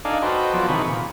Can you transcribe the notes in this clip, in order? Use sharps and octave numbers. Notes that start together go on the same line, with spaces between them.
D4 D#4 A4 D5 F5 G#5
F#4 A4 B4 C5 D#5 G5
F3 F#3 B3 A4 D5
C3 D#3 E3 G#4 B5 C#6
A#2